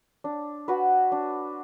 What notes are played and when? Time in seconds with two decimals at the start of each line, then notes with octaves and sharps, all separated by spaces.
0.24 D4
0.68 F#4 B4
1.12 D4